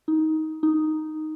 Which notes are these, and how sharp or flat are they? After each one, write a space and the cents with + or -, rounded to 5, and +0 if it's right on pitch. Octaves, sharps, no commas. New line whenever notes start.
D#4 +15
D#4 +0